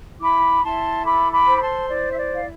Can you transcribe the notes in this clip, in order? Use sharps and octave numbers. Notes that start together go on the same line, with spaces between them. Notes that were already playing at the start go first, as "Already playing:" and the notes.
E4 B5 D6
E4 A5 C6
A4 B5 D6
B5 D6
C5
B5
A5 C6
E4 D5
E5
D5
E4 F5